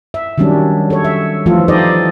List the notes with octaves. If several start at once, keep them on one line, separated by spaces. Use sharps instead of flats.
E5
D#3 F#3 G3 C#4 D4
A4 C#5
E5
E3 F3 A3 F4 A4
D#4 G4 A4 C5 D5 D#5